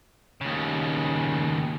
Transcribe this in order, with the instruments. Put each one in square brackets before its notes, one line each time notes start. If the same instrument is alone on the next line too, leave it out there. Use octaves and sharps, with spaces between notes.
[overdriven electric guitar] D#2 C#3